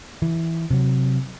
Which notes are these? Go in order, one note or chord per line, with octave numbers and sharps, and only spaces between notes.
E3
C3 F#3